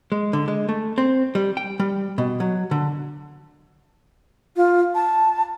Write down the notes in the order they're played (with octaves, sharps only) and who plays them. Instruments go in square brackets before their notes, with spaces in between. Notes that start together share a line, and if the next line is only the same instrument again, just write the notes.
[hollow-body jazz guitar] G#3
D3
G#3
A3
C4
G3
G5
G3
B2
F#3
D3
[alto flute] F4
A5